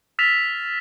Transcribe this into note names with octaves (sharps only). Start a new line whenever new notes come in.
E6 F6 A6 B6 E7 F7